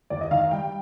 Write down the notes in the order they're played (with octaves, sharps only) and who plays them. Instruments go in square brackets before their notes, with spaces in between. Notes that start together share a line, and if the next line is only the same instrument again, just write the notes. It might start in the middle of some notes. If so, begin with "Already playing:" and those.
[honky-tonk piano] D#2 D5
D#5
D#3 F5
F5
G3 G5